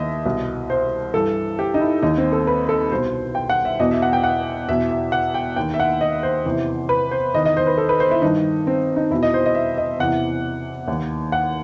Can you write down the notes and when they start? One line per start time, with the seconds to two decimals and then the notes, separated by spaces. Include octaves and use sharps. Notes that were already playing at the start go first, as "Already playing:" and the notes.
Already playing: D#2 D#3 D#5 E5
0.26 C2 B2
0.70 C5
1.14 G2 E3 A4
1.59 G4
1.74 D#4
1.81 E4
2.02 D#2 D#3 D#4
2.18 C4
2.32 A4
2.47 B4
2.69 A4
2.92 C2 B2 C5
3.35 G5
3.50 F#5
3.65 E5
3.80 E2 B2 D#5
3.91 E5
4.02 F#5
4.13 G5
4.24 F#5
4.69 E2 B2 E5
4.91 E5
5.12 F#5
5.34 G5
5.56 D#2 D#3 G5
5.74 E5
5.80 F#5
6.01 D#5
6.23 C5
6.45 E2 C3 E3
6.89 B4
7.11 C5
7.34 E2 D#3 D#5
7.45 D#5
7.57 C5
7.67 B4
7.78 A4
7.89 B4
8.00 C5
8.11 E4
8.22 G2 D#3 D#4
8.67 C4
8.96 D#4
9.10 E2 E4
9.14 B2
9.23 D#5
9.34 C5
9.46 D#5
9.55 E5
9.78 D#5
9.99 E2 C3 E3 F#5
10.88 D#2 D#3
11.32 F#5